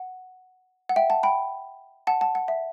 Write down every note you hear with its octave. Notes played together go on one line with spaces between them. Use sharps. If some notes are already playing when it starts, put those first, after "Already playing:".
Already playing: F#5
F#5
E5 G5
F#5 A5
G5 B5
F#5 A5
F#5 A5
F#5
E5